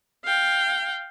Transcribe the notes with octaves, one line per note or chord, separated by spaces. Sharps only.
F5 G5